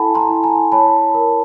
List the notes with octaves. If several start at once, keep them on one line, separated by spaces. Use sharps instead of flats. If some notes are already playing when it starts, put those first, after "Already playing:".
Already playing: E4 A4 F#5 G#5 A5 B5
A#5 C6
E4
G#5 A#5
C#5 A5 B5
A#4